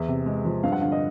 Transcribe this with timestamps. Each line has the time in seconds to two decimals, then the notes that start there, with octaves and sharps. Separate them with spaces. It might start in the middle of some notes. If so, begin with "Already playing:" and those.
Already playing: E2 E5
0.08 C3
0.26 G#3
0.45 F3
0.63 G2 F5
0.72 F#5
0.82 D3 F5
0.92 D#5